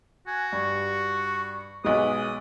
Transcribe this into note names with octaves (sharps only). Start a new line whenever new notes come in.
F#4 G#5
G2 C#6
B1 G#3 B4 D#6